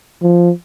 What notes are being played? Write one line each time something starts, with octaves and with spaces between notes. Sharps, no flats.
F3